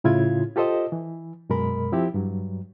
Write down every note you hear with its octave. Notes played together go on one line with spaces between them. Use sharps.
A2 C#3 E4 F4 G#6
F4 G4 A4 C5 D#5
E3
F#2 B2 G#3 A#4 B5
F3 C4 E4 G4
G2 F#3